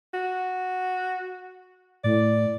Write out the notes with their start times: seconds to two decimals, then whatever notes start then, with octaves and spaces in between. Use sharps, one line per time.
0.14 F#4
2.04 A2 D5